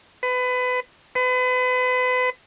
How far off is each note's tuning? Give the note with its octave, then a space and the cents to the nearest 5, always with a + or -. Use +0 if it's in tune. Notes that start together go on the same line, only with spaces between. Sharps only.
B4 +25
B4 +35